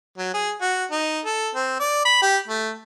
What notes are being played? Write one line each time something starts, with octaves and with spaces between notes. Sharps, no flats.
F#3
G#4
F#4
D#4
A4
C4
D5
B5
G4
A3